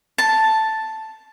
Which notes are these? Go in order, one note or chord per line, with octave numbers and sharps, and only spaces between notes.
A5